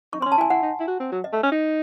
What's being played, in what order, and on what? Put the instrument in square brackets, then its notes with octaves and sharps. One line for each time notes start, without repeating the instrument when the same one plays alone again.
[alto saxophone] D#4 [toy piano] C#6
[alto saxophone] C4 [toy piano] C6
[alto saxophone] C#4
[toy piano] A5
[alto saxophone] E4 [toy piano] G#5
[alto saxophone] E4 [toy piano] F#5
[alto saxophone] D#4
E4
F#4
C4
F#3
[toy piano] D#5
[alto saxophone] A3
C#4
D#4